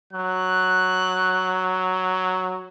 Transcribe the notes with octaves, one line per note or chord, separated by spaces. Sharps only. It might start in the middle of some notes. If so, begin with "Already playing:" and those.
F#3 F#6